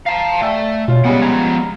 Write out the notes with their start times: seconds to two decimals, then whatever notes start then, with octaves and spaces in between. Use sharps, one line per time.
0.06 F5 A5 A#5
0.42 A3 D5 G5 G#5 E6
0.88 B2 F4 C#5
1.05 C#3 G3 G#3 B3 F#5 G#5
1.21 F3 C#5 A#5